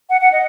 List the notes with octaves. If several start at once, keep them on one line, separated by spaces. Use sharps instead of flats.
F#5
F#5
D#5